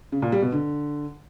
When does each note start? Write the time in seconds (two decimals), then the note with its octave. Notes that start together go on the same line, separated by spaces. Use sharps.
0.12 C#3
0.22 A#2
0.32 G3
0.42 B2
0.52 D3